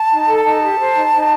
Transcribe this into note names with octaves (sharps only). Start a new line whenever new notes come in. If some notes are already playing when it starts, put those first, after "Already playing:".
Already playing: A5
D#4
A4
D#4 A5
G4
C5
D#4
D#4